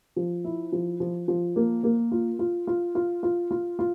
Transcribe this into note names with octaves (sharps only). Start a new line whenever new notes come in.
F3
E4
F3
F3
F3
A#3
A#3
F4
F4
F4
F4
F4
F4
F4